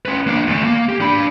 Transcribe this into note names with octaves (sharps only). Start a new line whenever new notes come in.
C#4 B4
A#3 D4
D2 A3
A#3
G4
D4 B5